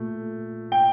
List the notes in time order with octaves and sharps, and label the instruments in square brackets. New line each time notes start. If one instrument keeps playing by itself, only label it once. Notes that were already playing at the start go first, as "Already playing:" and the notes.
Already playing: [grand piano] A#2 A3
G5